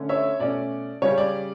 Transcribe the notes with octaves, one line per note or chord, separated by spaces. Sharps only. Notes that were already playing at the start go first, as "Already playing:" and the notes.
Already playing: D3 A3 C#4
C#5 E5
B2 A3 C#4 D5
C#3 G3 C#4 C#5
D5